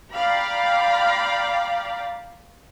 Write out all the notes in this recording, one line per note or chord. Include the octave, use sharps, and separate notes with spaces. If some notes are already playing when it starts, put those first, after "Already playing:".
D5 F5 G5 A#5 B5